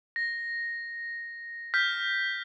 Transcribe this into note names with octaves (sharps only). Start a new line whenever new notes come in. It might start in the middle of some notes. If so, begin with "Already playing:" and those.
A#6
F6 G6 B6